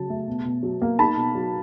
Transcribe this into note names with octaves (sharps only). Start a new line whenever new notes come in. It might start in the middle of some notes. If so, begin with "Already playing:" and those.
Already playing: C#3 F#3 A5
A3
B2
B2
F#3
A#3
D#4 A5 B5
B2
F#3